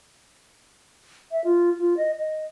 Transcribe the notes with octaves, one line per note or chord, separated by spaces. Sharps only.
E5
F4
F4
D#5
D#5